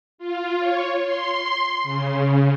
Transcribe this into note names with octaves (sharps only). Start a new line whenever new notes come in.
F4
C#5
C6
C#3